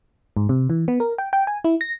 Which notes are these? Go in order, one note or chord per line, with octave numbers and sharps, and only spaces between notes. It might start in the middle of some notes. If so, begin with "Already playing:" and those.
G#2
C3
E3
B3
A#4
G5
G5
G#5
E4
A#6